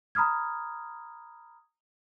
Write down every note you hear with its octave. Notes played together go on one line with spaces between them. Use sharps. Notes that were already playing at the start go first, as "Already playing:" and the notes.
A#5 B5 D#6 F6 G#6